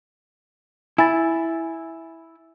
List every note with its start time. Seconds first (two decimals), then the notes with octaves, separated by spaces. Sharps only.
0.98 E4 G#5 B5 A6